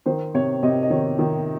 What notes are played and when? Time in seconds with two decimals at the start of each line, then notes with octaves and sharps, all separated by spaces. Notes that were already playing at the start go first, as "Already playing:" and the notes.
0.06 D#3 C5
0.34 C3 C#5
0.63 C3 D#5
0.83 D#5
0.90 D#3 C#5
1.19 D#3